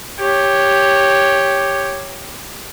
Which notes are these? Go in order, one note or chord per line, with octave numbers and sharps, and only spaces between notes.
G4 C#5